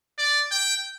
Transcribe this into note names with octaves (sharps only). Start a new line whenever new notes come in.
D5
G5